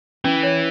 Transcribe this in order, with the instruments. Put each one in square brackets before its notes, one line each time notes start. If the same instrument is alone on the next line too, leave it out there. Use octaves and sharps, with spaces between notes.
[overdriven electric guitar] E3 [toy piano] C#4
[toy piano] C#5